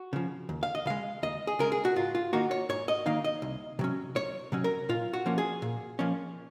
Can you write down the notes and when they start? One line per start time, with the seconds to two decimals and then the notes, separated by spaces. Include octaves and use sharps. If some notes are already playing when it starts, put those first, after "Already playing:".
Already playing: F#4
0.13 C#3 F3
0.49 D#2
0.63 F5
0.75 D#5
0.86 C#3 G#3 F5
1.23 D#2 D#5
1.47 G#4
1.59 C#3 G#3 A#4
1.72 G#4
1.85 F#4
1.96 G#2 F4
2.15 F4
2.33 D#3 A#3 D#4 F#4
2.51 C#5
2.69 G#2 C#5
2.88 D#5
3.06 D#3 A#3 D#4 F5
3.24 D#5
3.42 C2
3.79 C3 F#3 C#4
4.15 C2 C#5
4.52 C3 F#3 C#4
4.64 A#4
4.89 A#2 F4
5.13 F#4
5.26 F3 A#3 C#4
5.38 G#4
5.62 A#2
5.99 F3 A#3 C#4